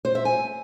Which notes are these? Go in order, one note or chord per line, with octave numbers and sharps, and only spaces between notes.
C5
E5
G#5